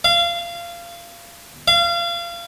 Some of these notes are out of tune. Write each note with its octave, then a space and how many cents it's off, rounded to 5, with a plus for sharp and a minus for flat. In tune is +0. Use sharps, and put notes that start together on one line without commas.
F5 -25
F5 -30